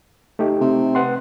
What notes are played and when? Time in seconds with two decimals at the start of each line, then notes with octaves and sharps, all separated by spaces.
0.39 A3 D#4 G4
0.61 C3
0.95 B4 F#5 C6